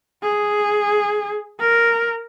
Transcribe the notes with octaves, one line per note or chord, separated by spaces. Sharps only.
G#4
A#4